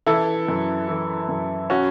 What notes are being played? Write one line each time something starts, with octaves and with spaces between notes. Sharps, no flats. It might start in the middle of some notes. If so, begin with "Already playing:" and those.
E3 E4 A4
F#2
E3
F#2
C#4 F#4